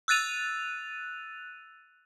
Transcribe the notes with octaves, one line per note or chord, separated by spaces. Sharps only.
E6 F#6 A6 D#7 F7